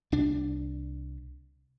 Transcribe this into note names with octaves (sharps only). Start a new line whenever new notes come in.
C2 D4